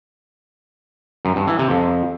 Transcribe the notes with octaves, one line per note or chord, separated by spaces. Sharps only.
F#2
G2
E3
C3
F2